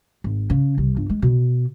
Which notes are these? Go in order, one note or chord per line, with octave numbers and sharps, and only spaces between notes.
G#1
C#3
C2
G1
G#3
B2